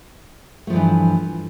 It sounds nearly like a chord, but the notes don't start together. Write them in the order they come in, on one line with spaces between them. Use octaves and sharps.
A3 F3 G2 E3